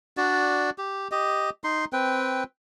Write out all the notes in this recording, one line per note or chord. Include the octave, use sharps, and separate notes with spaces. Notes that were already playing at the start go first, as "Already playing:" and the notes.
D4 F#4 D5
G4
G4 D#5
D#4 C6
C4 B4 G5